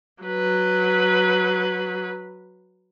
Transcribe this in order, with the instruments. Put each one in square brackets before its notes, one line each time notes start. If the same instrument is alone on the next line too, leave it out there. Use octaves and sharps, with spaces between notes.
[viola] F#3 B4